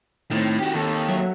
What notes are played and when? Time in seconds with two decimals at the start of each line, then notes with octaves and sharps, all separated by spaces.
0.31 A2 D#3 C4
0.59 F#4 G4
0.73 D#2 D#3 A4
1.09 F#3 E5